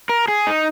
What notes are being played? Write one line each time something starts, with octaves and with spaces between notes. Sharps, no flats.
A#4
G#4
D#4